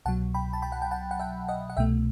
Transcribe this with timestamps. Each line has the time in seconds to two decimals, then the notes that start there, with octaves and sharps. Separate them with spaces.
0.05 C2 B2 F#3 F#5 A5
0.34 G5 B5
0.53 A5
0.62 G5 B5
0.72 F#5
0.82 G5
0.91 F#5 A5
1.11 F#5
1.19 E5 G5
1.48 D#5 F#5
1.70 F#5
1.77 C2 B2 A3 E5 G5